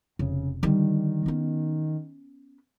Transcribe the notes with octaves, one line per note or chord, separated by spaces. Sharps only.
F1 C#3
D3 D#3 G3
B3 C#4